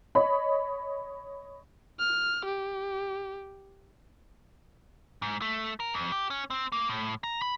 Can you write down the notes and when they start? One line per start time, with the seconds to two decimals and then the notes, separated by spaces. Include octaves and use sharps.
0.15 C#5 D#5 B5
2.00 F6
2.45 G4
5.22 G#2
5.42 A3
5.80 A#4
5.94 F2
6.12 G4
6.30 C#4
6.50 C4
6.72 A#3
6.89 A2
7.24 A#5
7.42 B5